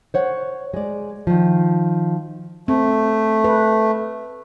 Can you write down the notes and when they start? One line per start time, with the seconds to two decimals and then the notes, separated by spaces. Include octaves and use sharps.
0.14 C5 C#5 F#5
0.74 G#3 D5
1.27 D#3 F3
2.68 A3 C4
3.44 B4